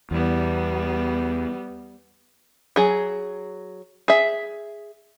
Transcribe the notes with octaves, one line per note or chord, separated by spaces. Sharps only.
E2 G3 B3
F#3 G#4
G#4 E5